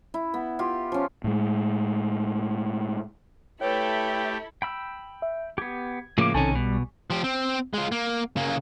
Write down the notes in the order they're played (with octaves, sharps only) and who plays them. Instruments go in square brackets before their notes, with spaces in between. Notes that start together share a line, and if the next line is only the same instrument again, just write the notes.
[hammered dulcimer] E4
B3
F4 G4
F3 C#4
[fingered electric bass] A2 G#3
[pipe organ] A3 G4 [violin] E4 A4 [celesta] B4 C#5 [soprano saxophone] G5
[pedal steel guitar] G5 B5 E6
[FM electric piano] E5
[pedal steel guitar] B3 G4 [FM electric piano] G#6
[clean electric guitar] A2 F3 A#3 [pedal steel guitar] C#3 D6
[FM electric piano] B1 G#5 C#6 [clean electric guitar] C3 D#3 C#4 [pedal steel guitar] A4
[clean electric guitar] B2 [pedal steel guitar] G3
[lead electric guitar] F3 G4
C4
G#3 F4
A#3
C#3 A#3